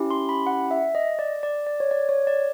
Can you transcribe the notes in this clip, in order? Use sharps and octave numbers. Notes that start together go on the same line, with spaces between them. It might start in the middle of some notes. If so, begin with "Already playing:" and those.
Already playing: C#4 E4 G4
C6
B5
F#5
E5
D#5
D5
D5
D5
C#5
D5
C#5
D5